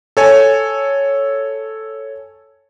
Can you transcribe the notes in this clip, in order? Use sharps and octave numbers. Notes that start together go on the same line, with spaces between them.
A4 C#5 G#5